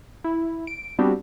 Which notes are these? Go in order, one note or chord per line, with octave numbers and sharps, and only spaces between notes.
E4
D7
G3 B3 C4 D4 F#4 G4